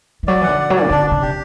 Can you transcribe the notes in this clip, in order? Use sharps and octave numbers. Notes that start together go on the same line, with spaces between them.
E3
F#3 D5
E3 F#5
D3
D5
F#3
D5
C3
D3 D4
D4
C3
G4